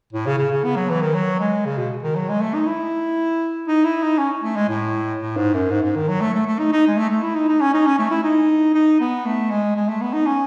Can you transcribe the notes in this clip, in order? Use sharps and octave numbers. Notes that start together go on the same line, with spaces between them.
A2
C#3
C#3
C#3
B3
F#3
E3
D#3
F#3
G#3
C#3
B2
D#3
F#3
G#3
A3
D#4
E4
D#4
E4
D#4
C#4
A3
G#3
A2
A2
G#2
F#2
G#2
G#2
D#3
F#3
A3
A3
A3
D#4
D#4
G#3
A3
A3
E4
D#4
D#4
C#4
D#4
C#4
A3
E4
D#4
D#4
B3
A3
G#3
G#3
A3
B3
D#4
C#4